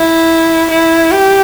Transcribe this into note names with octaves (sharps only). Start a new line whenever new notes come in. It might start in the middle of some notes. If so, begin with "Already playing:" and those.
Already playing: E4
E4
G4